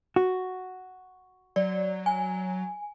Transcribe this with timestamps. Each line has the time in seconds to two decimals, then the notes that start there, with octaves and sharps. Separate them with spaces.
0.16 F#4
1.56 F#3 D5
2.06 G#5